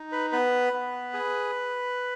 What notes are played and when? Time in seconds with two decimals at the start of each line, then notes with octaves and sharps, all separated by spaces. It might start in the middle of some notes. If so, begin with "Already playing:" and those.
Already playing: D#4
0.12 B4
0.32 B3 B4
0.73 B3
1.14 G#4